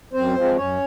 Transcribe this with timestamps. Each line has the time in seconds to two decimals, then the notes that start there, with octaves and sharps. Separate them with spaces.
0.13 F#2 C4 C5
0.35 F3 G#3 C4
0.56 F#2 C#4 C#5